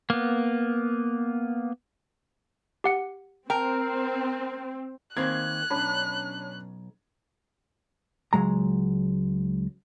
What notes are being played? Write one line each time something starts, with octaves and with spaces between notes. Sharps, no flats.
A#3 B3
G4 F#5 C#7
C4 A#4 G5
D#3 A#3 C4 F#6 G#6
B1 G2 C#4 D4 B5
C#2 F#3 G#3 A#5